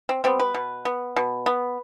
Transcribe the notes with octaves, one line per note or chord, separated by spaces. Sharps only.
C4
G3 B3 C4
B4
B2
B3
B2
B3